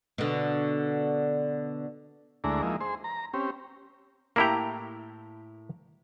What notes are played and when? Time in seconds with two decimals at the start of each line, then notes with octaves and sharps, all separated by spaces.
0.18 B2 D3
2.44 D2 G#3 A3 D4 E4 A#5
2.62 F3 G#3 A#3 D#4 E4
2.81 G#4 C5 C6
3.04 A#5
3.34 C4 C#4 G4
4.36 A2 A#3 E4 G4 A#5